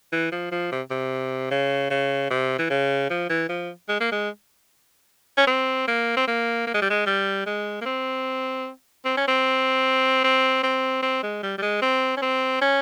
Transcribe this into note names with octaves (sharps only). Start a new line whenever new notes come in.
E3
F3
F3
C3
C3
C#3
C#3
C3
E3
C#3
F3
E3
F3
G#3
A#3
G#3
C#4
C4
A#3
C4
A#3
A#3
G#3
G3
G#3
G3
G#3
A#3
C4
C4
C#4
C4
C4
C4
C4
G#3
G3
G3
G#3
C4
C#4
C4
C#4